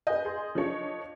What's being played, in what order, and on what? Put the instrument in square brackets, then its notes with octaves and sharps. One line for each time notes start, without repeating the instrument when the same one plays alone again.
[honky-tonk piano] B4 G#5 G6 [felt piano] D#5
[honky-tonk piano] G#4 C6
F3 D4 C#5